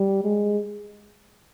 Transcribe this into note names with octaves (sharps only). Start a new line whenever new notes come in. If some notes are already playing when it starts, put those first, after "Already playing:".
Already playing: G3
G#3